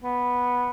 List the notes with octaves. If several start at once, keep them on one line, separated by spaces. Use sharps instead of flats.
B3